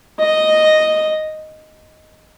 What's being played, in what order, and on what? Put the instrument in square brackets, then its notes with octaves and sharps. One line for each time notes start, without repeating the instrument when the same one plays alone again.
[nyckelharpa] D#5